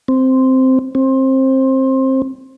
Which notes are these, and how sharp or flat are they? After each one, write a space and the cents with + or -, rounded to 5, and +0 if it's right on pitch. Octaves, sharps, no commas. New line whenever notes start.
C4 -5
C4 +20